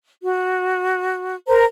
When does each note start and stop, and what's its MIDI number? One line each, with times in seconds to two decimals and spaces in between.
0.22 1.36 66
1.47 1.64 70
1.47 1.64 72
1.47 1.64 82